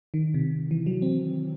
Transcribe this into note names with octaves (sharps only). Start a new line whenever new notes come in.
D#3
C3
E3
F#3
C4